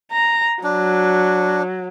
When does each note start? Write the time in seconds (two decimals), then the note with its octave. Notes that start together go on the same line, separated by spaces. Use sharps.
0.12 A#5
0.64 F#3 D4